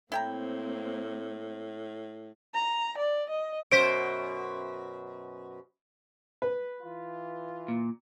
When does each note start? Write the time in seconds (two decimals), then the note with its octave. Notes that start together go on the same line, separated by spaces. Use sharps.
0.12 A2 A#3 C4 E4 G5 A#5
2.54 A#5
2.98 D5
3.30 D#5
3.72 F#2 B2 C5 B6 D7
6.42 B4
6.82 E3 F4
7.68 A#2